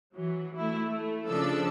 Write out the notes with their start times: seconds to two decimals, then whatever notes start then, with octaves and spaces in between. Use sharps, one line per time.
0.15 E3 F#3
0.56 A3 E4
0.89 A3
1.28 C#3 F3 D4 A4 E6